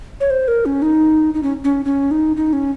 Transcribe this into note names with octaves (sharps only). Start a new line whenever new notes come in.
C#5
C5
A#4
C#4
D#4
D#4
C#4
C#4
C#4
D#4
D#4
C#4